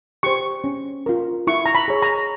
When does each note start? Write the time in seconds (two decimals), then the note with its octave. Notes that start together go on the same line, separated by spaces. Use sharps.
0.23 G4 C5 C#6
0.64 C#4
1.06 F4 A#4
1.47 E4 C#6
1.66 A#5
1.75 B5
1.88 G#4 C#5
2.02 A#5